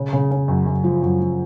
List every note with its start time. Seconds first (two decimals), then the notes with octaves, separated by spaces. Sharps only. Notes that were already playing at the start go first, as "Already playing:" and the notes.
Already playing: C#3
0.13 C#3
0.31 C#3
0.48 F#2
0.66 F#2
0.84 F3
1.02 F#2
1.20 F3